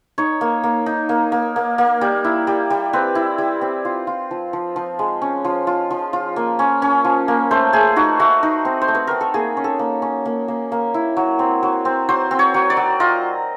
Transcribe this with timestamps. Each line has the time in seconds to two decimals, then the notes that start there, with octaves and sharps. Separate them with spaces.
0.18 D#4 C#5
0.41 A#3
0.63 A#3
0.86 D#4
1.09 A#3
1.32 A#3
1.56 A#3
1.78 A#3
2.01 G3
2.24 E4
2.47 G3
2.70 G3
2.93 C4 B4
3.15 E4
3.38 G3
3.61 C4
3.85 F4
4.07 F4
4.31 F3
4.53 F3
4.76 F3
4.99 G#3
5.22 C#4
5.45 F3
5.67 F4
5.91 F3
6.13 F4
6.36 A#3
6.59 C#4
6.82 C#4
7.04 F3
7.28 A#3
7.51 A3 C5
7.73 A3 G#4
7.96 D#4 F#4
8.20 A3 F#4
8.43 D#4
8.65 C4
8.82 C5
8.88 A3
8.95 B4
9.07 C4 A#4
9.21 A4
9.34 A#3 G#4
9.57 C#4
9.64 A4
9.79 A#3
10.02 C#4
10.26 A#3
10.48 A#3
10.72 A#3
10.94 E4
11.17 F#3
11.39 C4
11.63 F#3
11.85 C4
12.09 F#3 C5
12.31 C4
12.39 C#5
12.54 F#3
12.70 D5
12.77 F#3
13.00 F4 D#5